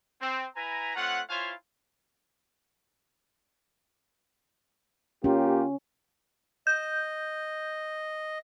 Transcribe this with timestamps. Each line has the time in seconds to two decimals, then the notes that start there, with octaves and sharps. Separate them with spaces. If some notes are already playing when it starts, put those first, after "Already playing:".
0.20 C4
0.55 E4 B4 G#5 A#5
0.96 A3 C4 F4 C#5 F#5
1.29 E4 F4 C5 C#5 F5 G#5
5.24 A#3 C#4 F4 G4
6.67 D#5 G6